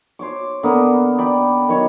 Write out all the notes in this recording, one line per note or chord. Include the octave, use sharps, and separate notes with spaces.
C5 C#5 D6
D3 A#3 B3
D5 G5 B5
D#3 F#3 C#5